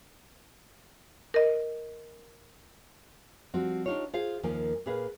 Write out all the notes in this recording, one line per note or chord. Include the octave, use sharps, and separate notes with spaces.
A#4 D#5
F3 G3 C4 F#4
D4 D#4 F4 G4 C#5
F4 G#4 C5 F5
D#2 D#3 F3 A#3 G#5
A#2 G#4 B4 E5 F5